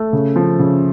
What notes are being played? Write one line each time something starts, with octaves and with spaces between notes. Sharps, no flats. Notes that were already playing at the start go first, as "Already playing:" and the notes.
Already playing: A3
C#3
F3
C#3